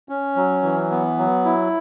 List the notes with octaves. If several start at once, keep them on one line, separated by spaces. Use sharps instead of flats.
C#4
F#3
E3
B3
F#3
E4